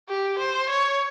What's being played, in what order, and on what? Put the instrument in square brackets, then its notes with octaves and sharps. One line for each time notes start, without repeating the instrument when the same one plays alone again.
[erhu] G4
C5
C#5